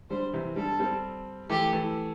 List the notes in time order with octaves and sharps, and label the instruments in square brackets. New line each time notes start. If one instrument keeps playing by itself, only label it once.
[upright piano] D3 G3 [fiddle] C5
[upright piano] C3 E3
[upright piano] D3 G3 [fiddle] A4
[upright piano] G3 C4
[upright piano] E3 A3 [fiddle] G4
[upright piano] E3 A3